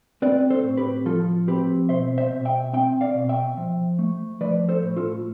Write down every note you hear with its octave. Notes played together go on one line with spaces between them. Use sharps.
C4 B4 D5
A4 C5
A2
G4 B4
F3 F4 A4
C4 G4 B4
B2 C5 E5
C5 E5
B2
E5 G5
C4 E5 G5
D5 F5
B2
E5 G5
F3
A3
F3 B4 D5
A4 C5
A2
F4 A4